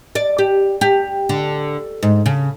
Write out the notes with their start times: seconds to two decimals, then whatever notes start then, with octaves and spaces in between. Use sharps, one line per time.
0.15 D5
0.38 G4
0.81 G4
1.29 D3
2.03 G#2
2.26 C#3